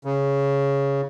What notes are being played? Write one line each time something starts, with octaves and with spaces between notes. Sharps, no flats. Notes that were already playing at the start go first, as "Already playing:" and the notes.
C#3